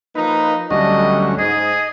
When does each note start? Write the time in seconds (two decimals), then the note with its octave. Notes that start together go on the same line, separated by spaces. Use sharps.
0.15 F3 A#3 D#4 B4
0.70 D2 F#3 G3 A3 C#4 D#5
1.39 G#2 G#4 D#5